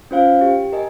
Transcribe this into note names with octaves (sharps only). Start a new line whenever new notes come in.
C#4 F4 C5 F5
G4
A#4 D#5 G#5